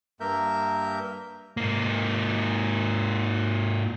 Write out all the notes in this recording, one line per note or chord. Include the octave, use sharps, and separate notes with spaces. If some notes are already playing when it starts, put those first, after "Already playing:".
G2 A#3 A#4 E5 G6
G#2 A#3